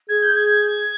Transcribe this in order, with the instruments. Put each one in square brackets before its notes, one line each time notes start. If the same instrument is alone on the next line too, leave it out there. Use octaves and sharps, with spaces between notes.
[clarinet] G#4 [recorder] G#6
[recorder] G6
G#6